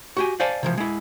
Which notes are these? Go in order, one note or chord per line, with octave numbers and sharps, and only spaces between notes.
F#4 G4 G#5
C5 D5 F5 G#5 A5
C3 E3 F3
G#3 E4